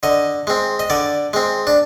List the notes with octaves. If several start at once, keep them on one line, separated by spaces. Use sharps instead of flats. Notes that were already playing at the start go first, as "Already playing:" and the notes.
D3 D#5
G#3 C4
D#5
D3 D5
G#3 C4
D4